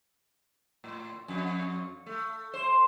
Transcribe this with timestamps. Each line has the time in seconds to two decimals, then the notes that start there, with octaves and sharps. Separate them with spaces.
0.84 A2
1.28 F2
2.06 A3
2.54 C5